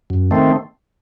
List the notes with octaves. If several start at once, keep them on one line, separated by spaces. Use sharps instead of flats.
F#2
D#3 A3 C4